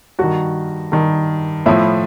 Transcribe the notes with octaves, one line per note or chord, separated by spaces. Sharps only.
G2 D#3 F#4
G2 D#3
A2 F3 E4